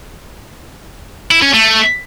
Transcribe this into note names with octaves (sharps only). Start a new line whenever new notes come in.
E4
C#4
A3